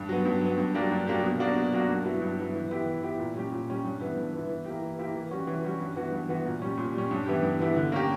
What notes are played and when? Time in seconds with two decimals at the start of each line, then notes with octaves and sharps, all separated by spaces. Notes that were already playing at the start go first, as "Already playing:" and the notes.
Already playing: G2
0.09 F#3 B3
0.25 G2
0.42 F#3 B3
0.58 G2
0.74 F#3 A#3 D4 G4
0.91 G2
1.07 F#3 A#3 D4 G4
1.23 B2
1.39 F#3 A#3 D4 F#4
1.56 B2
1.72 F#3 A#3 D4 F#4
1.89 G2
2.05 F#3 B3 E4
2.21 G2
2.37 F#3 B3 E4
2.54 E3
2.70 B3 E4 G4
2.86 E3
3.03 B3 E4 G4
3.19 A#2
3.35 G3 C#4 G4
3.52 A#2
3.68 G3 C#4 G4
3.84 G2
4.00 E3 B3 E4
4.17 G2
4.33 E3 B3 E4
4.49 E3
4.65 A#3 E4 G4
4.82 E3
4.99 A#3 E4 G4
5.15 E3
5.31 G3 C#4 F#4
5.47 E3
5.64 G3 C#4 F#4
5.80 G2
5.96 E3 B3 F#4
6.12 G2
6.29 E3 B3 F#4
6.45 A#2
6.62 G3 C#4
6.78 A#2
6.94 G3 C#4
7.11 G2
7.26 E3 B3 E4 G4
7.43 G2
7.60 E3 B3 E4 G4
7.75 D3
7.92 A#3 C#4 G4